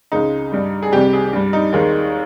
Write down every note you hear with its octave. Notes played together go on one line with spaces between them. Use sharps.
C#2 C#3 G#3 D#4
G2 G3
G#4
C2 C3 G3 G4
G#4
G2 G3
D#4
D#2 D#3 G#3